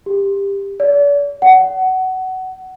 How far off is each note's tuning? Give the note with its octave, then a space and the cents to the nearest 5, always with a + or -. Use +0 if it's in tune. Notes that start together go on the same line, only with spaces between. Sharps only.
G4 +20
D5 -40
F#5 +20